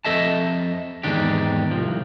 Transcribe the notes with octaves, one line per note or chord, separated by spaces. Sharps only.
F2 A4 D#5 E5 A5
E2 G#2 D#3 D4 G4
C2 F3